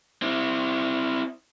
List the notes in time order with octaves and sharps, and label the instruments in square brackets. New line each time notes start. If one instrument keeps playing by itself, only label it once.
[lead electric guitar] C4 E4